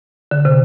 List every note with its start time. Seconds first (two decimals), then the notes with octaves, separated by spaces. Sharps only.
0.31 D3
0.45 C3